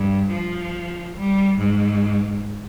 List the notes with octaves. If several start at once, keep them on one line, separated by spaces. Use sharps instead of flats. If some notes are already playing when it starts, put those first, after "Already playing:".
Already playing: G2
F3
G3
G#2